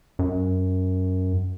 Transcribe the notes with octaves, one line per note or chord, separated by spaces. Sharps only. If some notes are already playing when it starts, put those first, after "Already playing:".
F#2